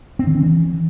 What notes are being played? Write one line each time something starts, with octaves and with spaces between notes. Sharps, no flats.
C4
D#3
C#4
E3